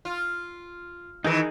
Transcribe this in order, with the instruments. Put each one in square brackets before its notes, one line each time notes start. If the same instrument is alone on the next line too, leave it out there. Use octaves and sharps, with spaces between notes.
[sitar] F4
[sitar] D#3 E3 [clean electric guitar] D#4 G#4 A#4